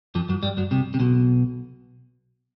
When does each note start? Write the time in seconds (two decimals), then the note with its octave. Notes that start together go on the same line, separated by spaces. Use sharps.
0.15 F2 F3
0.29 F#2 F#3
0.43 G2 G3
0.57 F#2 F#3
0.71 C2 C3
0.94 C3
1.00 B1 B2